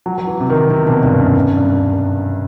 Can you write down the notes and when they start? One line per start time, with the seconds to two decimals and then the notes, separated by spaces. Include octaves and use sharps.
0.06 F#3
0.18 F#3
0.27 E3
0.40 C3
0.50 D#3
0.70 C3
0.87 B2
1.03 G2
1.19 F#2
1.35 F#2
1.57 G2